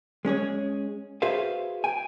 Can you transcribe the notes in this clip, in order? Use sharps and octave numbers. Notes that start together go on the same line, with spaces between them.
G#3 C#4 G#4 C#5
F#4 G#4 B4 C5 E5 F5
G5 G#5